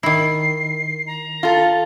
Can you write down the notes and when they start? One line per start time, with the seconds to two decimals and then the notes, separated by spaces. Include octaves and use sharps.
0.03 D#3 E4 C7
1.07 A#5
1.43 F4 A4